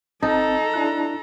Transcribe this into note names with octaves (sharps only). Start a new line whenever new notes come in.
G1 C4 D#4 A4 A5 A#5
D4 E4 F#6